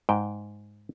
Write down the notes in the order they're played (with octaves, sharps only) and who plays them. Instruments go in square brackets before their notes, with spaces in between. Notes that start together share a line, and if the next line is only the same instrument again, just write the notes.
[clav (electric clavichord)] G#2 G5